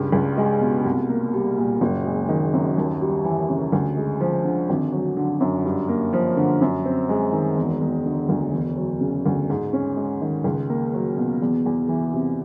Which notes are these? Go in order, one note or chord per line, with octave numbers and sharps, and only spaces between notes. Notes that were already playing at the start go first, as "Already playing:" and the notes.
Already playing: C#2 G2
C#2
G#3
B2
C2
A#3
G3
A#2
F#1
G#3
D#3
F#2
D#2
G3
E3
C#3
D2
G#3
F3
D3
G#1
F#3
D3
F#2
G2
A#3
F3
D3
F#2
C4
G#3
D#3
E1
E1
D3
D2
E1
F#3
C#3
D2
G#2
C#4
G#3
D#3
C#2
A#3
F#3
B2
E2
E2
E3
C3